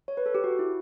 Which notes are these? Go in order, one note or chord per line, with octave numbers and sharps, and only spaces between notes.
C#5
B4
A4
G4
F#4
E4